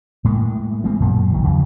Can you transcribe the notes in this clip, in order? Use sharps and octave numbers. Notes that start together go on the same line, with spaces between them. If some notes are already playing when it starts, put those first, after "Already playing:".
A2 G#3 A#3
G3 G#3 A#3 C4
F#2 A#2 F#3
B1 D3 D#3 F#3
E2 C#3 F3 F#3